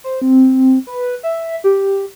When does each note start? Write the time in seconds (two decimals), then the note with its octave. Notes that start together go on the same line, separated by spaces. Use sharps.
0.04 C5
0.22 C4
0.87 B4
1.23 E5
1.64 G4